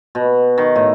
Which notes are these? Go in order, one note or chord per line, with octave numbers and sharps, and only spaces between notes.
B2
D#3
A2